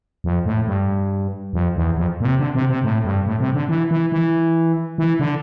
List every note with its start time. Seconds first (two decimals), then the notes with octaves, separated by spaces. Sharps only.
0.24 F2
0.45 A2
0.67 G2
1.53 F2
1.76 E2
1.97 F2
2.20 A#2
2.25 C3
2.39 D3
2.55 C3
2.69 C3
2.84 A2
3.05 G2
3.26 A2
3.40 C3
3.54 D3
3.69 E3
3.91 E3
4.12 E3
4.98 E3
5.19 D3